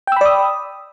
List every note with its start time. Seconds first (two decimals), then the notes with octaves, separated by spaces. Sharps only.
0.07 G5
0.12 E6
0.16 B5
0.21 D5
0.26 D#6